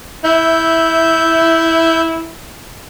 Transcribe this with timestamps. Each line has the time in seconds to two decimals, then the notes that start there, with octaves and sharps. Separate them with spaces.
0.24 E4 E5 G6